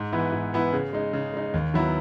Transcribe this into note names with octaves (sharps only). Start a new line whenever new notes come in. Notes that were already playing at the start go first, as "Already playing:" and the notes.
Already playing: G#2
E3 B3 E4
G#2
E3 B3 E4
C#3
G#3 D#4
C#3
G#3 D#4
D#2
D#3 F#3 B3 E4